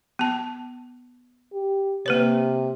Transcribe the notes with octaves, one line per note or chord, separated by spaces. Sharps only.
B3 A5
G4
C3 A#3 B4 C#5